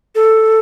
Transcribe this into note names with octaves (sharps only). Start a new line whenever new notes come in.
A4